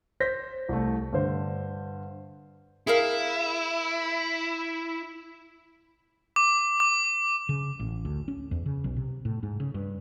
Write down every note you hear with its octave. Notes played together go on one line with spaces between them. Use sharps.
C5 G6 A#6 B6
C2 A3
G2 D3 C5
E4 G#4 A#4 F5
D6
D6
C#3
A1
D2
C#4
E2
C#3
B1
C3
A2
G#2
C#3
G2